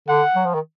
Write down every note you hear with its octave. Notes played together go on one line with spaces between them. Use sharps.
D3 F#5
F#3
F3
D#3